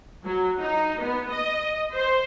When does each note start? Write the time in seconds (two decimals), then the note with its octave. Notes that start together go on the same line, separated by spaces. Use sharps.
0.24 F#3
0.60 D#4
1.01 B3
1.31 D#5
1.94 C5